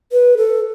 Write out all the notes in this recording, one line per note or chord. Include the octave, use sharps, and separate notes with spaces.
B4
A4